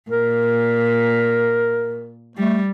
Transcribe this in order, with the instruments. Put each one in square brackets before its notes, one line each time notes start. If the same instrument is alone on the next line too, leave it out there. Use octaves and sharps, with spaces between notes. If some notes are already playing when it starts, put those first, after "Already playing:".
[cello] A#2 [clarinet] A#4
[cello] G3 [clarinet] A3